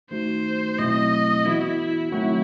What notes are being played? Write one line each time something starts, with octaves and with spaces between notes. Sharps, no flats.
D#3 A3 D#4 F#4 C5
B2 F#3 A3 C4 E4 D#5
E3 B3 E4 F#4
D#3 F#3 A3 C4 E4 F#4